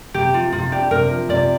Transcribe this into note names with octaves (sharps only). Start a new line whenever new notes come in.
C3 G4
F3 F4
C3 F4
D4 G4
C3 A#4
F3
C3 D5